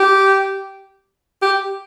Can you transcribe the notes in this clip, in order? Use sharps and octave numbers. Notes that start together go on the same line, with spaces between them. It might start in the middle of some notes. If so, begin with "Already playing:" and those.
Already playing: G4
G4